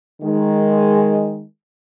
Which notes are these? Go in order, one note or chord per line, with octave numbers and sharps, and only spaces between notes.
D#3 G#3